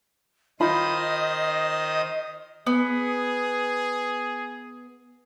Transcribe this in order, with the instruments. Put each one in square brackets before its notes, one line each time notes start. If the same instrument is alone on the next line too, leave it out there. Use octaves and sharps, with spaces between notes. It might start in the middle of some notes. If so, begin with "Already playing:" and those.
[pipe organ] D#3 C5 D#6 [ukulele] D#4 F4 B5 [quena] D#5
[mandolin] B3 [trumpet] G#4